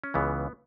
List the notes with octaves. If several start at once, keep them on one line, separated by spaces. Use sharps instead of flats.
C#4
C#2 C#3 E3 B3